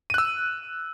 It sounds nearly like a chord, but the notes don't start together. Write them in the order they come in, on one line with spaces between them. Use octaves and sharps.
D#7 F#6 E6